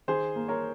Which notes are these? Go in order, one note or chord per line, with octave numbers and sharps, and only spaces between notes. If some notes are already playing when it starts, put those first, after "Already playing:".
D#3 G#4 C5
A#3
A#4 C#5